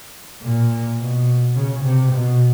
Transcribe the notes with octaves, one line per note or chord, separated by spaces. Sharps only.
A#2
B2
C#3
C3
B2